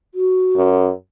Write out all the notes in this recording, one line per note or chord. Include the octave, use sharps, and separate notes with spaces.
F#4
F#2